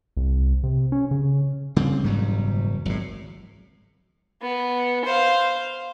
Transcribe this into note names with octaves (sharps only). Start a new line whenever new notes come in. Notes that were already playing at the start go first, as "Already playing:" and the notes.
C2
C3
C#4
C#3
C#3 G3 C4
F#1 G#2 B2 E3 F#3 G3
G#1 A2 F#3
B3
C5 F5